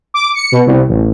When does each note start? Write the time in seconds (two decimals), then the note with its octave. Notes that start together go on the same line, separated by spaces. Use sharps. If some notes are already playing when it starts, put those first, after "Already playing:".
0.14 D6
0.35 C#7
0.52 B2
0.67 C2
0.89 A1